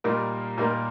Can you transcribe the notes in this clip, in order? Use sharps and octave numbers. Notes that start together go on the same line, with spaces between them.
A#2 G3 A#3 D#4 A#4
A#2 G3 A#3 D#4 A#4